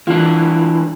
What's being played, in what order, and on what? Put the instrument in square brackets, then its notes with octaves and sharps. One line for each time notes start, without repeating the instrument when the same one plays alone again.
[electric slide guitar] E3 D4 [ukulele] F4